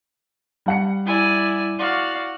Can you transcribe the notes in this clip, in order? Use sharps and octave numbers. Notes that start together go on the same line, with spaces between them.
G3 F#5 C#7
E4 D5 G#5
F#4 D5 F5